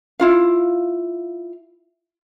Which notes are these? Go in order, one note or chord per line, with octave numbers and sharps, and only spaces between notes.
E4 F4 F5